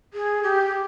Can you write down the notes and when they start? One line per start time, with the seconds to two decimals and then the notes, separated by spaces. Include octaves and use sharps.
0.14 G#4
0.43 G4